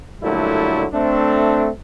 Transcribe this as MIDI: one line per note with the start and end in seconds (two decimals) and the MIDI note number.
0.22 0.85 46
0.22 0.85 50
0.22 0.85 54
0.22 0.85 55
0.22 0.85 57
0.22 0.85 64
0.94 1.68 57
0.94 1.68 60
0.94 1.68 62